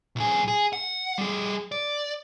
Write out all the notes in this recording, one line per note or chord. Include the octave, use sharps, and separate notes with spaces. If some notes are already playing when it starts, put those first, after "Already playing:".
B1 G#4
G#4
F#5
G3 G#4
D5